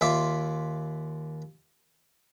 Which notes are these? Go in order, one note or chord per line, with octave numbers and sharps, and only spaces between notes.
D#2 F4 E5 C6 D6